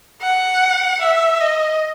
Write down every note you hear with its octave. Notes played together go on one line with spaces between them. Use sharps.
F#5
E5
D#5